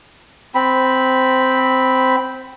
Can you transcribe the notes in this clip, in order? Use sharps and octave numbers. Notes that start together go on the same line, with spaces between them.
C4 B5